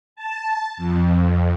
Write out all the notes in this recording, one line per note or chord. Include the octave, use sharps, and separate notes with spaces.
A5
F2